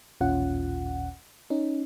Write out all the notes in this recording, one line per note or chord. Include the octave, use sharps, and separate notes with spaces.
A1 D#2 A#2 C#4 F4 F#5
C#4 D#4